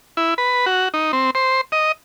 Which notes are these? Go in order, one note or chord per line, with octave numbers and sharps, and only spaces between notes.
E4
B4
F#4
D#4
C4
C5
D#5